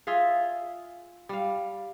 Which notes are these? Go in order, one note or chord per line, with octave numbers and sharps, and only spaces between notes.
F4 G#4 E5 F5
G3 F5